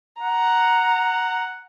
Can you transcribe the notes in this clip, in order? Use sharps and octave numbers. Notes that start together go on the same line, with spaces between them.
F#5 A#5